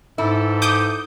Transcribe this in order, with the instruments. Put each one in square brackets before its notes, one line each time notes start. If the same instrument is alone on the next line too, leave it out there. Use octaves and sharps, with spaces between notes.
[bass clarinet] G#2 [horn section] E3 G4 A4 [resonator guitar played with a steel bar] E4
[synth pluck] D6 D#6 G6